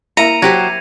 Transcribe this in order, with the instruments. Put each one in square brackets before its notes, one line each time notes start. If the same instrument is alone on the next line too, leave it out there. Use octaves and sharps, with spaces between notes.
[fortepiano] A#3 E4 [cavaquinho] A#5 [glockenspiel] C#7 D#7 F7
[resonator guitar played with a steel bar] F#3 G4 C5 [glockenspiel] G#6 A#6